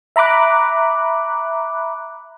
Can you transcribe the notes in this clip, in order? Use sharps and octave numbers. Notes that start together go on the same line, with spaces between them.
E5 A#5 B5 D6 F#6